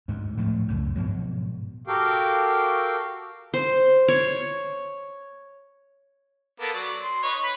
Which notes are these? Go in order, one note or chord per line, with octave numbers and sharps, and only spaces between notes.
D2 G#2
A2 F3 G#3 A3
C#2 F#2 A2
G#2 B2 F3 F#3
F#4 G4 A4 A#4 F5 G5
C5
C#5
A#3 B3 A4
F#3 D5
C6
D#4 B4 C#5
B4 B5